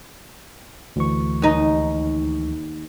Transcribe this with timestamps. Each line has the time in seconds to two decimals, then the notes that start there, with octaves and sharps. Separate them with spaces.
0.96 D2 E3 C#6
1.42 D#2 D#4